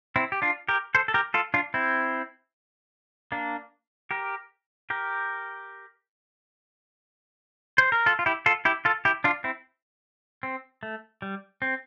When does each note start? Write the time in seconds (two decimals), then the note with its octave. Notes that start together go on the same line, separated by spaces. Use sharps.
0.16 C4 E4
0.32 G4
0.42 D4 F4
0.69 G4 A#4
0.95 A4 C5
1.08 A4
1.14 G4 A#4
1.34 F4 A4
1.54 D4 F4
1.74 C4 E4
3.32 A#3 D4
4.11 G4 A#4
4.90 G4 A#4
7.78 C5
7.92 A#4
8.06 F4 A4
8.19 F4
8.26 E4 G4
8.46 F4 A4
8.65 E4 G4
8.85 F4 A4
9.05 E4 G4
9.24 D4 F4
9.44 C4 E4
10.43 C4
10.83 A3
11.22 G3
11.62 C4